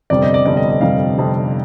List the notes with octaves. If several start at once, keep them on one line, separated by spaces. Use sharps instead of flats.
G1 F2 C3 G3 D5
D#5
D5
G1 F2 C3 G3 D5
D#5
D#5
G1 F2 C3 G3 F5
G1 F2 C3 G3